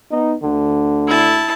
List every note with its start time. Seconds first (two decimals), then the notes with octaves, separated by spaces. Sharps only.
0.12 B3 D#4
0.43 D2 D3
1.08 E4 A5